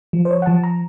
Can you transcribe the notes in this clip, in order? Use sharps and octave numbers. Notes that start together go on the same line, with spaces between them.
F3
C5
C#5
F#5
F3 A5
A#5